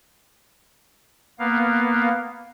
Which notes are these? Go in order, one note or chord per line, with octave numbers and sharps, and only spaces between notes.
A#3 B3 F5